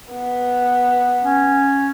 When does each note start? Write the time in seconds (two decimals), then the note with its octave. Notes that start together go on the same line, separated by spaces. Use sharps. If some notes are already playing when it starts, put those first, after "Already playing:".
0.13 B3
1.23 C#4